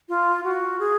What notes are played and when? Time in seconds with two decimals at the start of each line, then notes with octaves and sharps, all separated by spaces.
0.09 F4
0.44 F#4
0.80 G#4